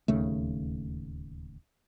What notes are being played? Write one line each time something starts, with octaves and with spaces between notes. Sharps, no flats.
D1 D#2 C#3 A3